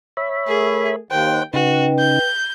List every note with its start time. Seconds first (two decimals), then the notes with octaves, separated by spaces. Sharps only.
0.17 C#5 E5 B5
0.48 A3 G#4 A#4
1.11 D#2 C5 F#5 G5
1.53 C#3 D#4 F#4 B4 G5
1.99 G6